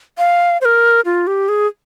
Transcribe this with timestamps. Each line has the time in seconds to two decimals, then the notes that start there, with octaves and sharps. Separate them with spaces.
0.18 F5
0.61 C5
0.65 A#4
1.05 F4
1.27 G4
1.49 G#4